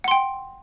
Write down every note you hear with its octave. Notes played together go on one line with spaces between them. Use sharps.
F#5 G5 C6